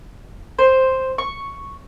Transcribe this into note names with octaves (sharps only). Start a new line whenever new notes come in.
C5
C#6